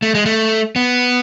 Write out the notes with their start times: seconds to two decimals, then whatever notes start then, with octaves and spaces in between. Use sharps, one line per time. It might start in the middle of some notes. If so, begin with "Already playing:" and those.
0.02 A3
0.15 G#3
0.26 A3
0.76 B3